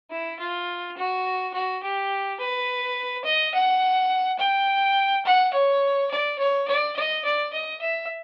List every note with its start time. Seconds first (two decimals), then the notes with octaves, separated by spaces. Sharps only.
0.11 E4
0.39 F4
0.97 F#4
1.54 F#4
1.83 G4
2.40 B4
3.25 D#5
3.54 F#5
4.39 G5
5.25 F#5
5.54 C#5
6.11 D5
6.39 C#5
6.68 D5
6.96 D#5
7.25 D5
7.53 D#5
7.81 E5